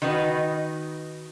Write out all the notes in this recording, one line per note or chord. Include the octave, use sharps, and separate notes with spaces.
D#3 D#4 F#4 B4